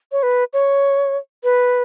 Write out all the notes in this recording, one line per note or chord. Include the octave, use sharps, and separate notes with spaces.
C#5
B4
C#5
B4